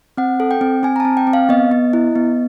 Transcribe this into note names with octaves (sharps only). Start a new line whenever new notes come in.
C4 F#5
A4
G5
C4
C4 G#5
A#5
A5
C4
G5
C4
F5
B3 D#5
B3
E4
B3